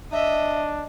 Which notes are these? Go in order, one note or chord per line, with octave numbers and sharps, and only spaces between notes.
D4 D#5 E5